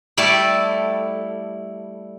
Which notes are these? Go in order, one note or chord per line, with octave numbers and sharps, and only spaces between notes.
G3 A3 E4 A4 D5